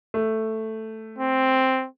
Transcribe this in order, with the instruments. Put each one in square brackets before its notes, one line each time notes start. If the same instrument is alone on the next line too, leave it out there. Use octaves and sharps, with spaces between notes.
[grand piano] A3
[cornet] C4